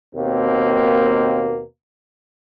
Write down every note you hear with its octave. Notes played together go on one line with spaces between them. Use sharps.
D#2 B2 A#3 C4